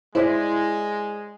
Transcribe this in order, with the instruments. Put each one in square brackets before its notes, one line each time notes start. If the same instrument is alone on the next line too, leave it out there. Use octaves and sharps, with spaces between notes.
[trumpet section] G#3 [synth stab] E4 [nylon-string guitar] C5 D5